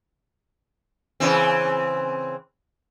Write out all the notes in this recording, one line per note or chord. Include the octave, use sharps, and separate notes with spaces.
C#3 E3 C4